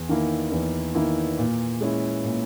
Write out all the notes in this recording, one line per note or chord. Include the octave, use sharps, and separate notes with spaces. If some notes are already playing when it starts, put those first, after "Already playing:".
Already playing: E2
D#3 A#3 E4
E2
D#3 A#3 E4
A#2
G#3 C#4 E4
A#2